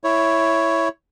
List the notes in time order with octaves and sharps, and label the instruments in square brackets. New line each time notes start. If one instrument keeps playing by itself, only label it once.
[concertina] E4 C#5